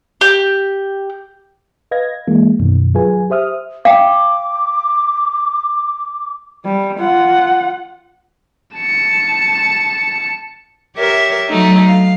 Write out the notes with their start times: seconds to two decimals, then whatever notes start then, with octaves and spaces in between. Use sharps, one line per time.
0.21 G4
1.91 B4 D#5 F5 G#6 A#6
2.27 E3 G#3 A#3
2.59 F#2 B2 D#3
2.94 F#3 F4 G#4 B4 G#5
3.30 G4 C5 E5 D#6 F6
3.85 F5 G5 D6
6.65 G3
6.99 F4 F#5
8.77 A5 C#7
10.96 G4 A#4 C#5 E5
11.49 F#3 A3 D#4
11.85 F5